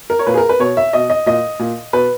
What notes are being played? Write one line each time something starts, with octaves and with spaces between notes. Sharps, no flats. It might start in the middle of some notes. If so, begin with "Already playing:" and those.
A#4
C#5
A#2 B4
G#4
A#4
B4
B2 C#5
E5
B2 D#5
D#5
A#2 D#5
A#2
B2 B4